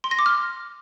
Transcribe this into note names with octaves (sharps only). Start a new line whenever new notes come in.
C6
A#6
D6
F6